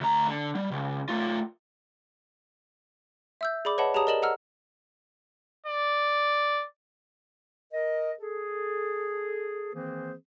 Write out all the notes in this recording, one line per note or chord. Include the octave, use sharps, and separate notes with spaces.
D2 A#5
D3
G3
C#2
A3 F4
E5 E6 G6
G#4 D5 B5 D6
B4 C#5 D#5 F#5 A5 B5
G4 G#4 C#5 A5 A#5 D#6
A#4 D5 D#5 E7 F#7
D#5 F#5 A#5 E6 F6
D5
A#4 D#5
G#4 A4
D#3 E3 A#3 C4 G#4 C5